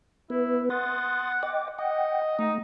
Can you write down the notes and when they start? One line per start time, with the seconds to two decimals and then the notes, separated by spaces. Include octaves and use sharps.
0.30 B3 E4 B4
0.70 F#5 C6 D#6 A6
1.43 D#5 G5 D6
1.79 D#5 F#5 G5
2.39 A3 D#4